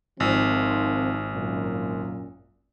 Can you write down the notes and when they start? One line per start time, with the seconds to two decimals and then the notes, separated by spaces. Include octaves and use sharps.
0.20 G#1 D#3 F3 C4
1.33 F#2 A#2